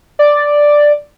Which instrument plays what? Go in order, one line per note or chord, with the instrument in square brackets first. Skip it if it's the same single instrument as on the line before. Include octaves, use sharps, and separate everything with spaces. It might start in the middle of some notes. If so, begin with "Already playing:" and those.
[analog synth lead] D5